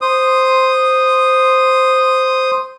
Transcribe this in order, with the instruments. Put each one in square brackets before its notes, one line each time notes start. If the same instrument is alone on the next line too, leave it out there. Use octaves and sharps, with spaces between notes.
[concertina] C5 D#6